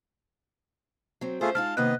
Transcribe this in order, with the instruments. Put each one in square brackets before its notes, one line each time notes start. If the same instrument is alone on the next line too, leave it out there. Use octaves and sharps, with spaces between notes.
[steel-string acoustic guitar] F#3 C4
[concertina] A3 F4 G#4 [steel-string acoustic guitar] C#4 C5
[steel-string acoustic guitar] G#3 D#4 F4 [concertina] A5 [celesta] F6
[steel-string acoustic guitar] C3 D#3 A#3 [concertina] B3 B4 D#5 [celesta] F#6